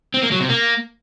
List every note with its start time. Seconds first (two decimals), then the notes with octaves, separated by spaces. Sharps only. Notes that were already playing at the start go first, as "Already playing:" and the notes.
0.14 C4
0.23 A#3
0.32 F#3
0.40 C3
0.49 A#3